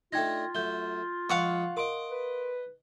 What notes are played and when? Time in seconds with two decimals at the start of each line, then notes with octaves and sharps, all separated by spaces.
0.12 A3 D4 D#4 F4 G5 G#6 A#6
0.55 F#2 A3 G6 G7
1.29 F2 G#3 F5 F#5 C#6
1.77 A#4 D#5 C6 D6 D7
2.10 B4